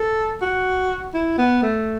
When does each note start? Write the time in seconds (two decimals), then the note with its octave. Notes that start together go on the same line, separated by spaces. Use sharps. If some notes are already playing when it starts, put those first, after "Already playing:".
Already playing: A4
0.42 F#4
1.14 E4
1.38 B3
1.62 A3